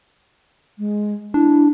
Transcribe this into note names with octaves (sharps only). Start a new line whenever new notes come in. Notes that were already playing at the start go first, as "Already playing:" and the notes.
G#3
D4 E4